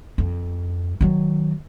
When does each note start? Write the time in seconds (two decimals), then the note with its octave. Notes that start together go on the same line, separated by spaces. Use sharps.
0.18 F2
1.01 D#3 F#3